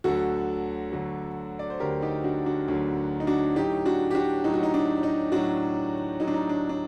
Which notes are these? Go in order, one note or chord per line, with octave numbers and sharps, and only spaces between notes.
D2 D3 F#3 F#4 A4
D2 D3 F#3
D5
C5
D2 D3 F#3 G4 A#4
D#4 G4
D4 F#4
D4 F#4
D2 D3 F#3
D#4
D4 F#4
A2 F#3 D#4 G4
D4 F#4
G4
D4 F#4
A2 F#3 D#4
F#4
D#4
D4
D#4
A2 F#3 D4 F#4
A2 F#3 D#4
D4
D#4
D4
D4